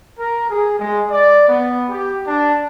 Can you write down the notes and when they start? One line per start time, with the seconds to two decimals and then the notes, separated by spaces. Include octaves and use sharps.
0.19 A#4
0.48 G#4
0.78 G#3
1.10 D5
1.49 B3
1.90 G4
2.26 D4